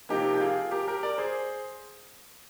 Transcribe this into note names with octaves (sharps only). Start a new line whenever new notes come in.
C3 F3 A#3 D#4 G4
G4
F4 G#4
G4 A#4
G4 A#4
A#4 D5
G#4 C5